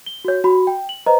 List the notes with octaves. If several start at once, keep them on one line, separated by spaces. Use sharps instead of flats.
G7
F#4 C#5
F#4 B5
G5
F#7
B4 C5 D#5 A#5